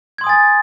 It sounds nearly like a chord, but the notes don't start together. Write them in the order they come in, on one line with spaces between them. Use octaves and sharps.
G#6 C6 D#6 G#5 A6